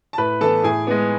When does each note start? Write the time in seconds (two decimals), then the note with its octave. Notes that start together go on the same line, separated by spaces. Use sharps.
0.13 A5
0.18 A2 B4 B5
0.41 E3 B3 A4 A5
0.63 A2 G#4 G#5
0.87 G#3 B3